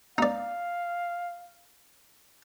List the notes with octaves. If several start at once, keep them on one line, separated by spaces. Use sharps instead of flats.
D#4 D5 F5